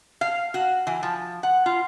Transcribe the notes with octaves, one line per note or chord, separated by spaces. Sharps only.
F5
F#4
E3
F3
F#5
F4